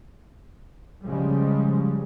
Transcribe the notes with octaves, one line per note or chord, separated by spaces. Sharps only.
C#3 F3 G3 G#3